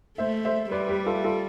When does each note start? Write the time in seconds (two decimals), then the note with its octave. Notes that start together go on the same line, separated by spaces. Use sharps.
0.18 A3 C5 E5
0.45 C5 E5
0.71 G3 B4 D5
0.88 G4 B4
1.06 F4 A4
1.24 F4 A4